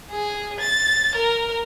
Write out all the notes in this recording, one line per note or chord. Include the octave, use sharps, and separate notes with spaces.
G#4
A6
A#4